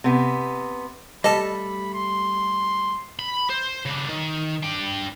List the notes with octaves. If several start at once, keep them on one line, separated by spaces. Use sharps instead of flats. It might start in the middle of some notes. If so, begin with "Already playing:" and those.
C3 B3
G3 A3 A4 D#5 A5 B5
C6
B5
C5
C#3 D4
D#3
D4 G5